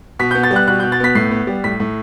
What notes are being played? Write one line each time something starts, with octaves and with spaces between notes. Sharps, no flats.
B2 B6
G6
B3
A6
G3
F#6
B2 F#6
B2 G6
A6
B3 B6
A2 C7
B3
G3
A2 B6
A2